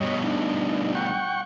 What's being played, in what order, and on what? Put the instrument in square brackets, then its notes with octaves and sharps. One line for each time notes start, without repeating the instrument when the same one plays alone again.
[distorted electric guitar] G2 B2 [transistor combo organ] C#5 D#5
[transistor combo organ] D4 D#4
F#5 G5 C#6